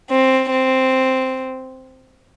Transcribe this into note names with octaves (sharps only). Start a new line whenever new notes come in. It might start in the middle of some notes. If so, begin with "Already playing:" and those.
C4
C4